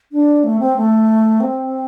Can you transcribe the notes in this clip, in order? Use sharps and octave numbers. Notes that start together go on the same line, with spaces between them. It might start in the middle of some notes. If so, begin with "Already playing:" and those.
D4
A3
C4
A3
C4